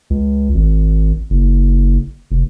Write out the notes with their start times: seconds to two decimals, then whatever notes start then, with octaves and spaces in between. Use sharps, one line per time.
0.10 C#2
0.54 G#1
1.30 F#1
2.31 F1